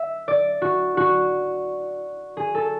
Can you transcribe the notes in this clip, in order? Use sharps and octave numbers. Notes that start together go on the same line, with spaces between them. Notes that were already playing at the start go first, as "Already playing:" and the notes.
Already playing: E5
D5
F#4
F#4
G#4
A4